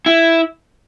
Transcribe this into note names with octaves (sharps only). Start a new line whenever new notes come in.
E4